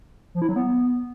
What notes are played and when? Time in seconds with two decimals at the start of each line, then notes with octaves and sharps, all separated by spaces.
0.35 F3
0.42 E4
0.49 F#3
0.56 B3